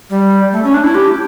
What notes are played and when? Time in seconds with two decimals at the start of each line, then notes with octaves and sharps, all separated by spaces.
0.10 G3
0.52 A3
0.64 C#4
0.74 D4
0.84 E4
0.95 G4